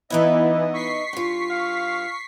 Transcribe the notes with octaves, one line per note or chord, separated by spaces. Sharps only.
E3 B3 D#4 E4 B4 D#5 E5
C#6 B6 C7
G2 F4
F5